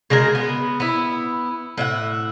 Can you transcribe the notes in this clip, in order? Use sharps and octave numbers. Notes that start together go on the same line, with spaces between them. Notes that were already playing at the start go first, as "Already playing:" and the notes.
C#3 G#3 F#4 A#4
B3
B3 E4
A2 E5 F#5